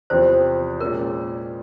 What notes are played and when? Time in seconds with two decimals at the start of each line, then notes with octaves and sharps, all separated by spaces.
0.10 E2 C3 F3 C4 C5
0.80 A#2 G#3 C#4 A#4